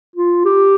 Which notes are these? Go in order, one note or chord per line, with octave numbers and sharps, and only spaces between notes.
F4
G4